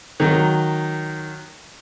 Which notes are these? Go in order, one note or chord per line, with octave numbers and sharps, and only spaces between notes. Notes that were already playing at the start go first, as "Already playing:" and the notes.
D#3 F#3